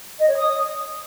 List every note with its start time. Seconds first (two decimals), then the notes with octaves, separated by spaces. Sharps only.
0.20 D#5
0.29 C#5
0.38 D#6